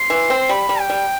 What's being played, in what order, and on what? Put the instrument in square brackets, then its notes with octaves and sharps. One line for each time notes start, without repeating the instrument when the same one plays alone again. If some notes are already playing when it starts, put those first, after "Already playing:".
Already playing: [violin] C6
[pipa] E3
C4
[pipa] G3 [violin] B5
[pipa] G3
[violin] G5
[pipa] G3